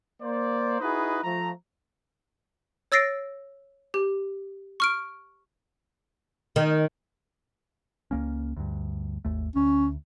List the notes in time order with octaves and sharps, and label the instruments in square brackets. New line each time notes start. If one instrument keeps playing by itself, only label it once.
[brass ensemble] A#3 C5 D5
D#4 E4 F#4 G#4 B4 D#5
F3 A3 A#5
[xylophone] C#5 E6 A6 A#6 C7 D7
G4
C#6 F6 D7
[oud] D#3
[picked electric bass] C#2 A#3 C#4
D2 G2
G#1 D#2 A3
[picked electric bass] D2 [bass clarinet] C#4